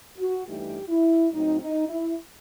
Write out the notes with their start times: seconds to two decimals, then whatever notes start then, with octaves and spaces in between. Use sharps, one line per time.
0.18 F#4
0.46 G2 E3 A3 D#4 G4
0.89 E4
1.32 A2 F#3 C4 D#4
1.61 D#4
1.89 E4